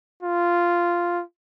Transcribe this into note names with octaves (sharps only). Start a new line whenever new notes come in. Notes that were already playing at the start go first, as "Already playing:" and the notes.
F4